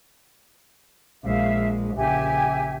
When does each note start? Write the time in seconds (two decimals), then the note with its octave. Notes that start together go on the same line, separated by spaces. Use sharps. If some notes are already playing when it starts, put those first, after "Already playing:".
1.24 A#1 G#3 E5 F5
1.97 A#1 C#3 G4 E5 G#5